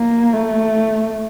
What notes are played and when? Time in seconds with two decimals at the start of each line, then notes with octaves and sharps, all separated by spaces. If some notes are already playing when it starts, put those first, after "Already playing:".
Already playing: A#3
0.34 A3